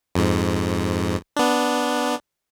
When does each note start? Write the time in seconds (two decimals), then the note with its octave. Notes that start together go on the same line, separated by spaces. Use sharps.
0.15 F2 G#2
1.36 B3 D4